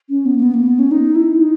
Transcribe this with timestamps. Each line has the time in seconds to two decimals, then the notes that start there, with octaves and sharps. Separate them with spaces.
0.10 C#4
0.26 B3
0.37 A#3
0.42 B3
0.54 A#3
0.66 B3
0.79 C#4
0.91 D#4
1.15 E4
1.41 D#4